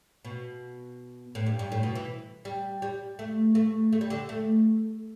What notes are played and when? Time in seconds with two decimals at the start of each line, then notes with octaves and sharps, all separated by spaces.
0.25 B2
1.35 A2
1.46 G2
1.59 G2
1.72 A2
1.83 B2
1.95 E3
2.45 G3
2.82 G3
3.19 A3
3.55 A3
3.93 A3
4.01 G3
4.10 D3
4.29 A3